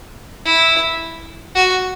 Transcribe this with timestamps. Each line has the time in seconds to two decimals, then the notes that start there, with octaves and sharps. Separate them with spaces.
0.46 E4
1.56 F#4